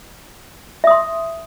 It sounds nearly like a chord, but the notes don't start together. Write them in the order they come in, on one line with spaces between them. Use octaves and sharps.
E5 D#6 C6